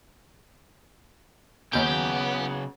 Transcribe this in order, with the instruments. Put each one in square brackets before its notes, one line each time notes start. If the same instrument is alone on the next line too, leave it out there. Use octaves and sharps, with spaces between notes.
[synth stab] D#2 G6 [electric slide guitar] C#3 F#3 C#4 [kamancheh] B3 [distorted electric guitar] G4